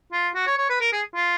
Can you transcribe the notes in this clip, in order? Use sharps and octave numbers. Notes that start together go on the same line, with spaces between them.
F4
F#4
C#5
C#5
B4
A#4
G#4
F4